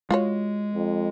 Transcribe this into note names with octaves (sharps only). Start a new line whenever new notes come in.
G#3 F4 F#4 C#5
F2